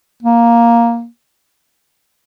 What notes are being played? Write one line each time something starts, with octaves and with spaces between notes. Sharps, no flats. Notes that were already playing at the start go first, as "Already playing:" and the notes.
A#3